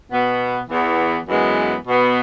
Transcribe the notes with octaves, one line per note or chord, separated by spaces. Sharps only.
B2 B3
E2 E3 B3
F#2 E3 G#3 B3
B2 B3